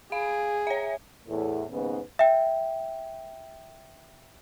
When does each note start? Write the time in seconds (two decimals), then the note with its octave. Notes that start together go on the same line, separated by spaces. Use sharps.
0.12 G#4 F5
0.67 C#5 E5
1.28 E2 A2
1.71 D#2 G#2 C#3 B3 B4
2.19 E5 G5